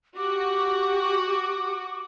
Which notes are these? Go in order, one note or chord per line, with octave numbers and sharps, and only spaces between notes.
F#4 G4 D6